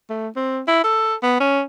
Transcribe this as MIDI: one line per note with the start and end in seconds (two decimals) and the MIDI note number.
0.10 0.28 57
0.36 0.61 60
0.68 0.84 64
0.84 1.14 69
1.23 1.37 59
1.40 1.62 61